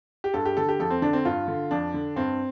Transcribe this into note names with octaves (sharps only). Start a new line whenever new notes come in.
G4
G2 A4
G4
D3 A4
G4
F2 A4
C4
D3 D4
C4
G2 F4
D3
F2 D4
D3
G2 C4